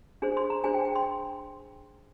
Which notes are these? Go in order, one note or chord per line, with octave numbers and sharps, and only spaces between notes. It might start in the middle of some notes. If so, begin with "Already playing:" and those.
D4 G#4 C5
C6
A#5
D4 G#4 C5 G#5
G5
G5
C6